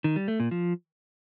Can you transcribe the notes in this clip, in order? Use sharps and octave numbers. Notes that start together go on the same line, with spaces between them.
D#3
G3
A3
A#2
F3